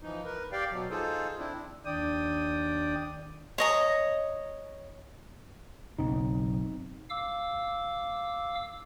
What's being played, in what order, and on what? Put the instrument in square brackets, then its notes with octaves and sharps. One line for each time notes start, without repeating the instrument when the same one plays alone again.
[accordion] E3 F3 D#4
A#4 B4
G4 D5 F5 G5
B2 F#3
D#4 F4 G#4 A4 C5
C4 D4 E4
[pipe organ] D#2 D4 D5 G5 D#6
[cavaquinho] C#5 D#5 A#5
[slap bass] F#1 B1 [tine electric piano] C4 D#4
[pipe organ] F5 D6 E6